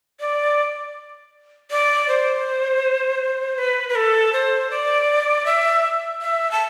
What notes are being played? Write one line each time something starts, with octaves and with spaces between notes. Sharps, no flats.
D5
D5
C5
B4
B4
A4
C5
D5
E5
E5
A5